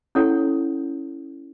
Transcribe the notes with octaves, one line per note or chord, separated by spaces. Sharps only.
C#4 E4 A4 C#5 F#5